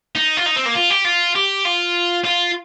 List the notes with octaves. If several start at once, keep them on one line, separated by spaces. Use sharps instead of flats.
D#4
F4
D#4
C4
A#3
F4
G4
F4
G4
F4
F4